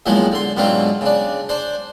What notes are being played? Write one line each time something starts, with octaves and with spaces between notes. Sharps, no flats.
E2 A#2 D#3 F3 F#3 G#3
D3 C6
G#2 B2 D3 F#3 C4 F4
C#3 D4
D4 C5